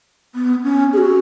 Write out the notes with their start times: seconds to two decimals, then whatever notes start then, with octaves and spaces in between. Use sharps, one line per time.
0.35 B3
0.64 C#4
0.93 G#4
0.98 F#4